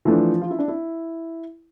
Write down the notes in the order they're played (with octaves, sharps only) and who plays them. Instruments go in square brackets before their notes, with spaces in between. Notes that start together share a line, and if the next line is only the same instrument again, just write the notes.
[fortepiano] E3 A3 D4 [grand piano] F3
[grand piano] F4
E4
D4
E4